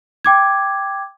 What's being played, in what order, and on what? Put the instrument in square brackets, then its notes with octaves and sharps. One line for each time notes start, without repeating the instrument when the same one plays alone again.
[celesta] G5 D6 G#6